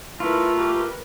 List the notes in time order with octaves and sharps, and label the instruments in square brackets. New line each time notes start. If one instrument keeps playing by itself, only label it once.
[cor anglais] A3 [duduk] E4 [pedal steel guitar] F4 [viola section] A#4 B4
[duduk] G4